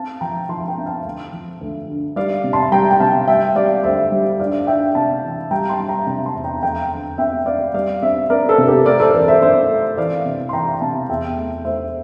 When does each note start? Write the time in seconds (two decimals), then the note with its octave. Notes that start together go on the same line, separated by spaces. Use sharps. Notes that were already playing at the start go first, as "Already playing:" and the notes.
Already playing: C4 F5 A5
0.21 F3 G5 A#5
0.49 F3 A5 C6
0.68 G5 A#5
0.78 C4
0.86 F5 A5
1.05 D2
1.32 F3
1.61 D2
1.88 D3
2.16 G3 D5 F5
2.44 C3
2.53 A5 C6
2.72 G3 G5 A#5
2.91 G5
3.00 C3 F5 A5
3.27 G3 E5 G5
3.56 G3 D5 F5
3.83 D2 C5 E5
4.12 G3
4.39 D4 D5 F5
4.67 D4 E5 G5
4.95 C3 F5 A5
5.24 E3
5.51 G3 G5 A#5
5.69 A5 C6
5.79 G3
5.88 G5 A#5
6.07 C3 G5 A#5
6.26 A5 C6
6.35 E2
6.44 G5 A#5
6.62 F2 G5 A#5
6.91 D3
7.18 C4 E5 G5
7.46 C4 D5 F5
7.74 G3 D5 F5
8.02 C4 C5 E5
8.30 C4 A#4 D5
8.49 A4 C5
8.58 C3
8.67 G4 A#4
8.86 A3 A#4 D5
9.00 A4 C5
9.14 E3 A#4 D5
9.28 C5 E5
9.42 C4 C5 E5
9.70 A3
9.97 E3 D5 F5
10.25 C3
10.49 C6
10.53 E3 G5 A#5
10.81 C3 F5 A5
11.09 E2 E5 G5
11.37 A3
11.65 A3 C5 E5